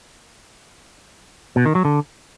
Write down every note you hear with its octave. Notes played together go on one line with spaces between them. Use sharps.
B2
D#3
F#3
D3